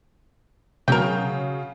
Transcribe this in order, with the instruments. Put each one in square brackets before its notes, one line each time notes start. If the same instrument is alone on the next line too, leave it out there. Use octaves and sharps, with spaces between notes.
[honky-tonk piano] C#3 F#3 [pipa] A#4 G5